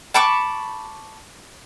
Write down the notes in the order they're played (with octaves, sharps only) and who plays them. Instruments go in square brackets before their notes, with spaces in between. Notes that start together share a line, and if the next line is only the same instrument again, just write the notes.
[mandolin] A5 B5 C#6 D6